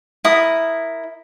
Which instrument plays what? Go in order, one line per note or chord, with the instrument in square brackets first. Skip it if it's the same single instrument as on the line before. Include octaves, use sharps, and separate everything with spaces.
[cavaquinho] E4 A#4 D#6